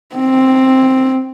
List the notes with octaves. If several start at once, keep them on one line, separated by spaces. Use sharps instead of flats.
C4